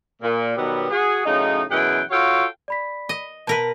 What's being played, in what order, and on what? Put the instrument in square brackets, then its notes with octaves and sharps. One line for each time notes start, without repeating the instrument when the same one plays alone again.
[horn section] A#2
B2 D#3 F#3 G3 B3
F#4 G#4
F#2 A2 C#3 D#4
F#2 B2 E3 G#4 F#5 G5
F4 F#4 A4 C#5 F5 G5
[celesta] D5 B5 B6
[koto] D#5
[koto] B2 A#4 B4 [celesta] A5 B6